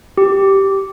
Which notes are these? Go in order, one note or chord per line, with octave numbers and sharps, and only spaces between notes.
G4